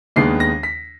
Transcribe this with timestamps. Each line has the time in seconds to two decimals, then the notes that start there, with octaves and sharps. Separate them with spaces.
0.16 D#2 D#3 G#3 B3 D4 C7
0.40 A#6
0.63 B6